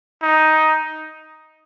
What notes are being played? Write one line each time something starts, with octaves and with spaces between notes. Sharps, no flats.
D#4